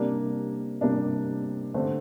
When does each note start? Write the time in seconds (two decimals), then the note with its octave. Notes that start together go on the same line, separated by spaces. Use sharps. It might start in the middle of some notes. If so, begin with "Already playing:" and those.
Already playing: C3 G3 A#3 D4
0.81 C3 G3 A#3 D4
1.74 D3 A3 C4